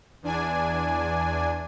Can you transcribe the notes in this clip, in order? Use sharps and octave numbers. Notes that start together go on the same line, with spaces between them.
E2 D4 G#5